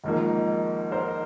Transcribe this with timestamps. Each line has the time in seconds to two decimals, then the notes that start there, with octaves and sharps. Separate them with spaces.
0.04 G#1 G#2 F3 A#3
0.92 A#4 C5